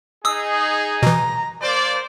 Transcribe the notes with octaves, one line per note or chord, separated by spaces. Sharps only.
D#4 G#4 D#6 E6
B2 E3 A#5
A#3 C5 D5